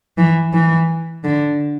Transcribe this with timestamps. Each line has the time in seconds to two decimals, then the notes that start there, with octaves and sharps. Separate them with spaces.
0.18 E3
0.53 E3
1.24 D3